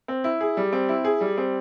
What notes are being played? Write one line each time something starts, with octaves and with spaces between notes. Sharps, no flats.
C4
E4
G#4
G3
C4
E4
G#4
G3
C4